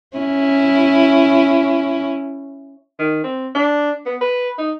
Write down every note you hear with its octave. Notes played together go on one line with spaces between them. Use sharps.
C#4 E4
D#3
C4
D4
B3
B4
D#4